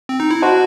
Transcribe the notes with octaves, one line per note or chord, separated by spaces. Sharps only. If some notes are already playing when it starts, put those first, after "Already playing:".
C4
D#4
E4
F#4 C5 D#5 F#5 A5 C6